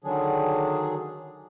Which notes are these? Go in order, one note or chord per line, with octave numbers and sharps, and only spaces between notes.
D3 D#3 F#3 D4 G#4